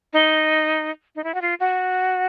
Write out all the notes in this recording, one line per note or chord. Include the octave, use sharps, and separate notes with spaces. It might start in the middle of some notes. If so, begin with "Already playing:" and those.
D#4
D#4
E4
F#4
F4
F#4